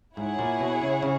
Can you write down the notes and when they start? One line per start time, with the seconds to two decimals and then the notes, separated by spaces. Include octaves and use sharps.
0.17 G#2 E4 G#4 C#5 F#5
0.39 A#2
0.60 B2
0.82 C#3
1.02 C#3